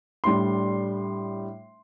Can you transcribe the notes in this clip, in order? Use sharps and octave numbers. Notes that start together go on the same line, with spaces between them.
A2 G3 D4 C6